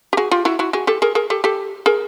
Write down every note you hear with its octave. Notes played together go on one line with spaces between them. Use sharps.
G4
F#4 G#4
F4 G4
E4 F#4
E4 F#4
F#4 G#4
G4 A4
G#4 A#4
G#4 A#4
G4 A4
G4 A4
G#4 A#4